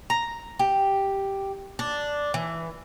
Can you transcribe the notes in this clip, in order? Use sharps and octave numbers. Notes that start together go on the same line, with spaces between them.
A#5
G4
D4
E3